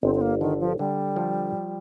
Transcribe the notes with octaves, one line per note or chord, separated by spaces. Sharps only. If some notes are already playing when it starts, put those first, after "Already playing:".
G1 C4
C4
A#3
D3 D#3
F3
D3 G3
F3